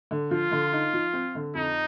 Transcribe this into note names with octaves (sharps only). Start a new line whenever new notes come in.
D3
F3 F4
D3
D#4
F3
C4
D3
F2 D#4